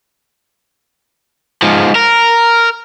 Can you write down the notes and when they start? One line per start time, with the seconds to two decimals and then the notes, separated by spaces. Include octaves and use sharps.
1.63 G#2 F3
1.95 A#4